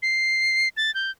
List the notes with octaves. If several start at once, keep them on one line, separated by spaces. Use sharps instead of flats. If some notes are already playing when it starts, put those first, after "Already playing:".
C7
A6
G6